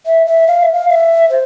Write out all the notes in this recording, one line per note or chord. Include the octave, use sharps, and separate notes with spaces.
E5
E5
F5
E5
F5
E5
C5